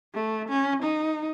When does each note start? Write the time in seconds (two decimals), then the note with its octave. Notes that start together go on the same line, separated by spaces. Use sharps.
0.15 A3
0.49 C#4
0.83 D#4